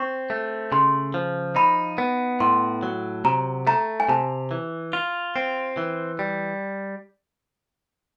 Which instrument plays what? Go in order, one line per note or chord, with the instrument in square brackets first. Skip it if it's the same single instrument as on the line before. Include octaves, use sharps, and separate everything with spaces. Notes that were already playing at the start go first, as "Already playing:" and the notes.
Already playing: [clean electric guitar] C4 [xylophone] C#6
[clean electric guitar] A3
[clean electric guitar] C#3 [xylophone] C6
[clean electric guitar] F3
[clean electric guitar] D#4 [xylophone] B5
[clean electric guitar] B3
[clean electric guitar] A2 [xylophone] C6
[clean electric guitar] F#3
[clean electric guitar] C3 [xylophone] A#5
[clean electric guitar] A3 [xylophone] A#5
[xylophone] G#5
[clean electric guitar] C3 [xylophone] A5
[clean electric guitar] E3
F4
C4
E3
G3